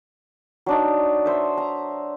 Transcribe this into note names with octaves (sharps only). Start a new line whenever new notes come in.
F#3 D4 D#4
C5 E5
A#5